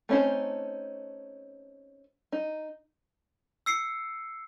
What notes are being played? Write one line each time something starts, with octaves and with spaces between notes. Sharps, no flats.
A3 C4 C#4 D#4 C5
D#4
E6 C7 C#7